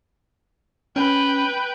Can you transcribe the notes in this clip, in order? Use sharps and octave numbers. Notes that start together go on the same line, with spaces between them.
C#4 B4 G5